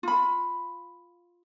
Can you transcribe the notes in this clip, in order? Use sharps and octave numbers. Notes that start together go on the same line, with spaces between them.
F4 B5